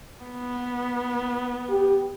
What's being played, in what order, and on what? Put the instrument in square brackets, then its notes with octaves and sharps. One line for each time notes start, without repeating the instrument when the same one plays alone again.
[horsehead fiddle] B3
[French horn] G4